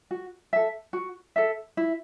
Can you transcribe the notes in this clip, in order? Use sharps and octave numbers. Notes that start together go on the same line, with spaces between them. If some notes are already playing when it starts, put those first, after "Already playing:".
F#4
A4 E5
F#4
A4 E5
E4